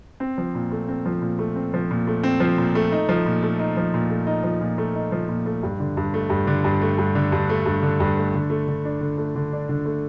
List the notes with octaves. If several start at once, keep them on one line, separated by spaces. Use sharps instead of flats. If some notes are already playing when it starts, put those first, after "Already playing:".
C4
F3
A#2
A3
C4
F3
A#2
A3
C4
F3
A#2
A3
C4
F3
A#2
A3
D#4
F3
A#2
A3
D#4
F3
A#2
A3
D#4
F3
A#2
A3
D#4
F3
A#2
A3
G2
D3
G2
A3
G2
D3
G2
A3
G2
D3
G2
A3
G2
D3
G2
A3
D3
A3
D3
D4
D3
A3
D3
D4
D3
A3